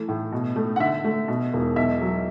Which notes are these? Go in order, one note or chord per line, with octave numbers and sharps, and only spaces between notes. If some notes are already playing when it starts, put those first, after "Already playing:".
Already playing: E3 A3
A2
B2
A3
F#5
D3 E5
A3
B2
E1
B1 E5
F#3